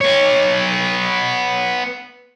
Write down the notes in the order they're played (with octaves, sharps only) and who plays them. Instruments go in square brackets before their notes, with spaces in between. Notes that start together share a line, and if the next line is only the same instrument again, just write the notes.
[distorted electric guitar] B3 C#5